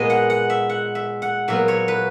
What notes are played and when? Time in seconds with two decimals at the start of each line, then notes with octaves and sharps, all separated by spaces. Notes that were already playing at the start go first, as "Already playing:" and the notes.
Already playing: A#2 G#3 B3 D#5
0.10 F#5
0.30 F#5
0.50 E5
0.70 F#5
0.95 E5
1.22 F#5
1.48 A#2 F#3 B3 E5
1.68 C#5
1.88 B4